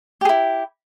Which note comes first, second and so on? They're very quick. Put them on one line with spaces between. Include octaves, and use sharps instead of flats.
G4 G#4 E4